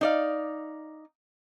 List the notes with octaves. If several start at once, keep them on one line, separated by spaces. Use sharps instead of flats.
D#4 D5 F5